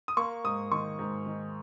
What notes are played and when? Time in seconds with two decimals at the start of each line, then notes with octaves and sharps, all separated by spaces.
0.08 D#6
0.17 A#3 C#6
0.44 G#2 D#6
0.71 D#3 C#6
0.99 G#2
1.26 D#3